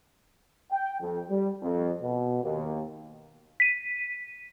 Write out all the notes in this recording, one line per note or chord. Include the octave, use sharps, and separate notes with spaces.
G5
F2
G3
F2
B2
D#2
B6 D#7